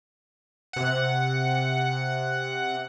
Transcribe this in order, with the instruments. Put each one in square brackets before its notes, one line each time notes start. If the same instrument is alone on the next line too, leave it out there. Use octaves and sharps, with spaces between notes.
[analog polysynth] C3 F#5